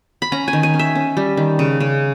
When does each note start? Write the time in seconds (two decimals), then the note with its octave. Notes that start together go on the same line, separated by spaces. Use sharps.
0.22 B5
0.32 C#4 A#5
0.48 G#5
0.53 D#3
0.63 G#5
0.74 C#4
0.79 E5
0.95 C#4
1.17 G3
1.37 D#3
1.59 C#3
1.80 C#3